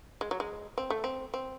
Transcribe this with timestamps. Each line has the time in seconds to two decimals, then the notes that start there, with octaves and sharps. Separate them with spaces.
0.21 G#3
0.31 F#3
0.40 G#3
0.78 C4
0.90 A3
1.04 C4
1.34 C4